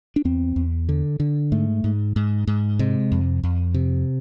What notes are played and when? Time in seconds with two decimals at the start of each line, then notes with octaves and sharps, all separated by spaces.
0.16 D4
0.25 E2 C4
0.56 E2
0.89 D3
1.20 D3
1.52 G#2 A3
1.84 G#2
2.16 G#2
2.47 G#2
2.79 C3 G#3
3.12 F2
3.43 F2
3.74 C3